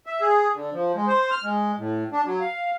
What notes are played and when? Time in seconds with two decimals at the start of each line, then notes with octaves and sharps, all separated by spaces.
0.06 E5
0.21 G#4
0.55 D3
0.74 F3
0.95 G#3
1.07 C5
1.31 F6
1.44 G#3
1.78 A2
2.12 D4
2.26 F#3
2.40 F5